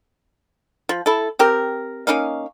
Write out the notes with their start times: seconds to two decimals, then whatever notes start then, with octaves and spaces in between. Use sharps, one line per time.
0.89 F3
1.06 E4 A4
1.39 C4 G4 A#4
2.07 A#3 C#4 D#4 F5